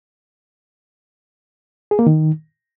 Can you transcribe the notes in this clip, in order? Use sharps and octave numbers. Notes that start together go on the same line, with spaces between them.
G#4
A#3
D#3